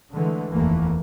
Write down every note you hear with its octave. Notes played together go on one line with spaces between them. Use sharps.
D3 E3 G#3 A3
F1 D#2 E3 A3 A#3